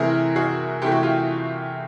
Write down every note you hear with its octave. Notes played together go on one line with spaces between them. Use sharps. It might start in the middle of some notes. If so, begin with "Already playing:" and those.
Already playing: C3 E3 A3 G#4 A#4
F#4 G#4
C3 E3 A3 G4
F#4
F4 G4